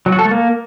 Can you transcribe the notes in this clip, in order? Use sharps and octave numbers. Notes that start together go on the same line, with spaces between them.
F#3
F#4
A4
A3
A#3